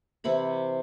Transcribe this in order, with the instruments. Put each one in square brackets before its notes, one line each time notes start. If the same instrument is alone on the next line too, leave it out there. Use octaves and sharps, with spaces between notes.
[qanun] C3 E3 E4 B5